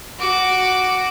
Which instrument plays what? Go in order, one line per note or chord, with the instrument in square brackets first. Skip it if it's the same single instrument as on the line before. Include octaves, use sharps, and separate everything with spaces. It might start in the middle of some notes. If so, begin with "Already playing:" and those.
[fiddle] F#4 D6